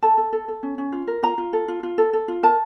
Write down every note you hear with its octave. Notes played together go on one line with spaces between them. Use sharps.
A4 A5
A4
A4
A4
C#4
C#4
F4
A#4
F4 A#5
F4
A4
F4
F4
A4
A4
F4
A#4 A5